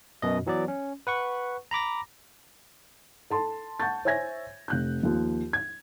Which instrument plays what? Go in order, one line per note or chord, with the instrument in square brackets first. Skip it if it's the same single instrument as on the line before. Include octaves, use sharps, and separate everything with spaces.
[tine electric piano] F#2 B2 D#5
E3 F#3 B3 D5
C#4
B4 F#5 C#6
A#5 B5 D6 A#6
[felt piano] A4 A5 C6
F#5 A5 C#6 G6 A6
C5 C#5 E5 G#5 G#6 A#6
F1 F#6 G6
D#2 F3
G#6